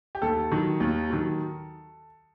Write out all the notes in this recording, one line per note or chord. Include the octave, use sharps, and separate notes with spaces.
G4
D#2 A4
D#3 F#3
D#2
D#3 F#3